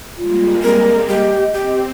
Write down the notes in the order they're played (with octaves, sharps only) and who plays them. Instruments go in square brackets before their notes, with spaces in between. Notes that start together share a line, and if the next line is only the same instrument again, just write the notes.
[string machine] G3 G#3 A#3 [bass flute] F4
[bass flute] C4 [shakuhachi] A#4
[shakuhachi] G4 [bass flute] D#5
[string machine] C4 [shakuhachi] G4